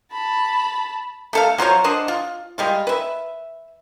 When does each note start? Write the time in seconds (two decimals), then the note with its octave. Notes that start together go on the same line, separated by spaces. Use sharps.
0.12 A5 B5
1.33 A3 A4 F5
1.58 F#3 F4 C5 C#5
1.84 D4 C5 D#5 F#5
2.08 F4
2.58 G3 G#3 F4
2.87 B4 E5